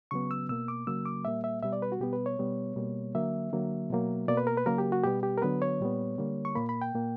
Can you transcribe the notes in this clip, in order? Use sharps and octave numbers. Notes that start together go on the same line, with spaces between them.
C#3 F#3 B3 C#6
E6
B2 A#3 E6
D6
C#3 F#3 A#3 E6
D6
A#2 G3 A#3 E5
E5
B2 G3 B3 E5
D5
B4
F#4
B2 G3 B3 G4
B4
C#5
B2 G3 B3
B2 G3 A#3
D3 F#3 A#3 E5
D3 F#3 A#3
B2 F#3 A#3
B2 A#3 D5
B4
A#4
B4
C#3 F#3 A#3 A#4
G4
F#4
B2 G3 B3 G4
G4
A#4
D3 F#3 B3 B4
C#5
A#2 G3 B3
D3 G3 A#3
C#6
A#2 A#3 B5
B5
G5
A#2 A#3